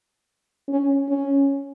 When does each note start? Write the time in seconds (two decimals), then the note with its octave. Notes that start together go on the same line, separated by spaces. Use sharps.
0.69 C#4
1.09 C#4